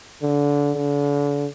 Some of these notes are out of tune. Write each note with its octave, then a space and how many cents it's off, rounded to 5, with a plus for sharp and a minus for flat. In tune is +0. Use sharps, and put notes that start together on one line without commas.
D3 -25
D3 -35